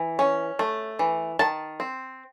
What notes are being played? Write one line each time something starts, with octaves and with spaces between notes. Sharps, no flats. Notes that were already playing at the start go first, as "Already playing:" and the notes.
Already playing: E3
C#4
A3
E3
D#3 A5
C4